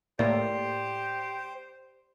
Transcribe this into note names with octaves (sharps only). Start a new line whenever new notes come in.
A2 A#3 G4 C5 D5